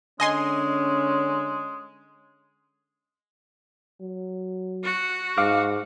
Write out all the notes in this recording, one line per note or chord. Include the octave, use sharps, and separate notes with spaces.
D3 G#3 C#4 D#5 G#5 C6
F#3
F#4
G#2 F5 D6 F6